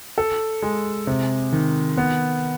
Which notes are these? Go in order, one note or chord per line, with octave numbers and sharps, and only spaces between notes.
A4
G#3
C3
D#3
B3